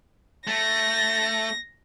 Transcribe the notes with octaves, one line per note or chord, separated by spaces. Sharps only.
A3 A#6